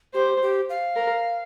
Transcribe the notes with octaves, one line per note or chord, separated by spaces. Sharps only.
G4 C5
G4
F5
A#4